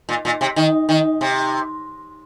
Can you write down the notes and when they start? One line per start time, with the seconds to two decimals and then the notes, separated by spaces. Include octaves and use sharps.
0.09 A#2
0.25 A#2
0.41 C3
0.56 D#3
0.89 D#3
1.21 C3